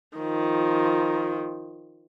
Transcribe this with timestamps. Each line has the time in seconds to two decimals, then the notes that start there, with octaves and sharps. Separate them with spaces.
0.17 D#3 F3